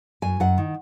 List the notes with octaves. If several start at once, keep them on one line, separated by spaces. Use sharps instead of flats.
F#2 G#5
F#2 F#5
D#3